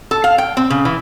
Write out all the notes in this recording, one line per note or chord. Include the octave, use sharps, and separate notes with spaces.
A4
F5
G5
C4
C#3
E3